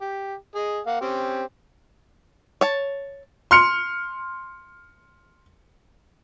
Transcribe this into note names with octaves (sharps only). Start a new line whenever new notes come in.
G4
G#4 D#5
A#3 F5 F#5
C4 C#4 G4
C#5 A5
C6 F6 C#7